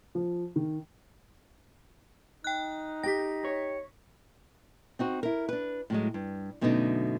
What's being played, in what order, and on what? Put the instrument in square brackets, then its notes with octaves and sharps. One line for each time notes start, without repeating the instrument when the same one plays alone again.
[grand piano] F3
D#3
[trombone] D#4 [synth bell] G5 F#6
[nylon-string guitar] G4 G5 [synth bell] A#6 B6
[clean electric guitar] C#5
[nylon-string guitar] C4 D#4 F#4
E4 A#4
D4 B4
A2 F#3 G#3
G2
F#2 B2 D3 A3 C4 D#4